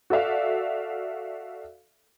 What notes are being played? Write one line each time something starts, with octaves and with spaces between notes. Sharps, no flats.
F#4 A4 D5 E5 F5